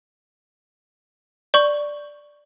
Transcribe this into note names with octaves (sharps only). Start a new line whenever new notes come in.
D5 C#6